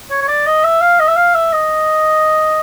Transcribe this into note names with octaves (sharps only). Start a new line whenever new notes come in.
C#5
C#5
D5
D#5
E5
F5
D#5
E5
F5
E5
D#5